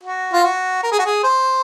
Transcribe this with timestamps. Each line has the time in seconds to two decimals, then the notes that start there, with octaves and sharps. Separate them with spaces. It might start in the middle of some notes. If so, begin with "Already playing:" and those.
0.03 F#4
0.33 F4
0.44 F#4
0.83 A#4
0.92 G#4
0.99 F#4
1.06 G#4
1.24 C5